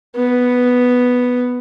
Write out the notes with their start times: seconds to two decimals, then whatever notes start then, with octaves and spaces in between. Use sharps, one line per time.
0.16 B3